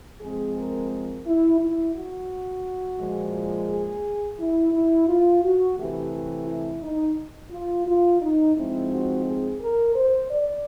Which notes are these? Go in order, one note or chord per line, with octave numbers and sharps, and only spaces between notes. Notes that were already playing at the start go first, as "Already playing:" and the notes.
F3 G#3 C4 G#4
A#4
A#4
E4
E4
F#4
A#2 F3 G#3
G#4
E4
E4
F4
F#4
C3 E3 A3 G4
G4
E4
D#4
F4
F4
D#4
F3 G#3 C4 D#4 E4
F#4
G#4
A#4
C5
D5